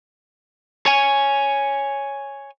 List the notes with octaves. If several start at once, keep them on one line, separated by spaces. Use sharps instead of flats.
C#5 G#5